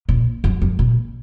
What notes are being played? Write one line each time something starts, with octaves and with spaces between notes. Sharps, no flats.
A#2
F#2
F#2
A#2